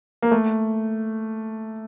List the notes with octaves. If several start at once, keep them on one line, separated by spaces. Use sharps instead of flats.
A#3
A3